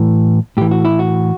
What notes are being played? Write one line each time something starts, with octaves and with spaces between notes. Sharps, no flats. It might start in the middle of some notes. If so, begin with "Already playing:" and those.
Already playing: A2 E3
A2 E3 G4
F#4
E4
F#4